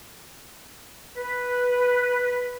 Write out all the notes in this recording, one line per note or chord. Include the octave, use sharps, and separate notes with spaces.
B4